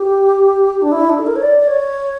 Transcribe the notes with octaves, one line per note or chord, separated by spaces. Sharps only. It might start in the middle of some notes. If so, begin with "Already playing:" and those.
Already playing: G4
D4
E4
D4
A4
A#4
C#5
D5
D5
C#5